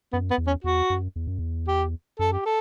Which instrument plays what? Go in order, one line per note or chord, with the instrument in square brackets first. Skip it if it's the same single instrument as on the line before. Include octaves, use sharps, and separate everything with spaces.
[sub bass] F#2 [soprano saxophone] B3
[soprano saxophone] B3
[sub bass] E2
[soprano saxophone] C#4
[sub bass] E2 [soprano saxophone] F#4
[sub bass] F#2
E2
F#2
E2
[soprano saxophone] G4
[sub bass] F#2 [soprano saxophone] A4
[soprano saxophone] G4
A4